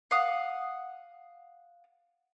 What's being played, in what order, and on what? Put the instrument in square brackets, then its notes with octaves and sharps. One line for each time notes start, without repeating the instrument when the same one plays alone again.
[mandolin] F5 F#5 D#6